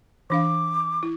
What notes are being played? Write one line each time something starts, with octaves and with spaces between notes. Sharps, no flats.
E3 D4 F5 D6
E4